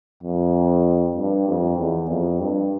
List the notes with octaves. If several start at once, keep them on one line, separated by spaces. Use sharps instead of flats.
F2
G2
F2
E2
F2
G2